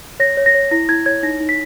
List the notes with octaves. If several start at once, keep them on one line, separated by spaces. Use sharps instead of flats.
C#5 A#6
C#5
A#6
C#5
E4 A#6
E4 G#6
C#5 G#6
D#4 A#6
D#4
B6